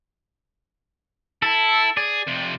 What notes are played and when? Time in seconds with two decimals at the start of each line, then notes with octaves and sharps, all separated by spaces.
1.42 E4 A4
1.97 G#4 D5
2.27 F2 C3